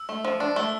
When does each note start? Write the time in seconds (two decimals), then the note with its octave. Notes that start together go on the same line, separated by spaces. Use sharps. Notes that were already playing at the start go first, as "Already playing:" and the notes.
Already playing: E6
0.09 A3
0.25 F3
0.40 D4
0.56 A3 E6